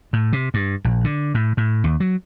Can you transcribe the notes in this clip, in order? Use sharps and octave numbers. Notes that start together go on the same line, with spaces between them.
A2
C3
G2
A#1
D3
A2
A2
D#2
F#3